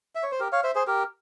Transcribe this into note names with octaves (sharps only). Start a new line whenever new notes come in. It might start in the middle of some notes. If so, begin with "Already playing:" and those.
E5
C#5
C5
G4 A#4
C#5 F5
C5 E5
G#4 C5
G4 A#4